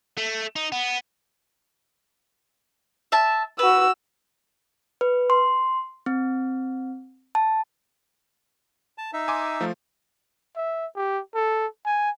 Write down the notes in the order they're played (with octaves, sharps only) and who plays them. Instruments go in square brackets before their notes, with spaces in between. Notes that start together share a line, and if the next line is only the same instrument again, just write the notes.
[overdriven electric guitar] A3
D#4
B3
[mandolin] E5 A5
[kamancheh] F#4 E6 [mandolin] B4
[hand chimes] B4
C6
C4
A5
[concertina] A5
D#4 E5
[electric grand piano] G#5 C6 D6
F3 A3 F4
[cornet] E5
G4
A4
G#5